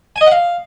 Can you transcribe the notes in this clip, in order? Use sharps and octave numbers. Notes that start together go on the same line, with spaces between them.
G#5
D#5
F#5
F5